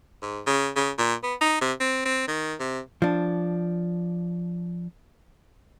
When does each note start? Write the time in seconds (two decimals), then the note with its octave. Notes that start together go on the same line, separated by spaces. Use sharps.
0.22 G#2
0.47 C#3
0.76 C#3
0.98 A#2
1.23 B3
1.41 D#4
1.61 C3
1.80 C4
2.05 C4
2.28 D#3
2.60 C3
3.02 F3 D4